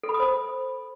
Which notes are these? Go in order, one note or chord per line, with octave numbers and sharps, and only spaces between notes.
A4
B5
D#6
C5